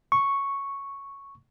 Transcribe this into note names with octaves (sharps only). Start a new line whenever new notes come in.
C#6